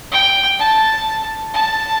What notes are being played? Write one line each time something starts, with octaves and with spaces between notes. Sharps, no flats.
G5
A5
A5